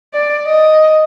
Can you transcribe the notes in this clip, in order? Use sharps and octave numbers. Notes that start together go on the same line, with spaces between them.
D5
D#5